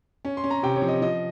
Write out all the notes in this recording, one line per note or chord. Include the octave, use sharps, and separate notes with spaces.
C#4
C6
C#4
A#5
C3 G5
C#5
F3
D#5
F3 D#5